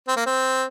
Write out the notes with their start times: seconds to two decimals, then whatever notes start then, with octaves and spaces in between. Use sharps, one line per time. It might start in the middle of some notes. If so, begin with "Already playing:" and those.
0.08 C4
0.16 A#3
0.26 C4